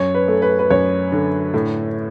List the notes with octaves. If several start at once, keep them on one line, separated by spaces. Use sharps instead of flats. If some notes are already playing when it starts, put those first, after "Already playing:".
Already playing: F#2 C#5
B4
A3
B4
B4
F#2 C#5
D3
A2